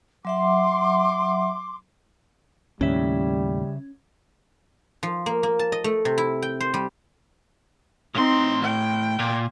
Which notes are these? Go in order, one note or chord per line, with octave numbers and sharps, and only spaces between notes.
F#3 E5 F#5 C6 D6
D#2 A2 C#3 G3 C#4 E5
F3
A#3
A#3
A5
D#5
A3
C3
E4
G5
C5
G3
A2 C4 D#4 C6
G5
A#2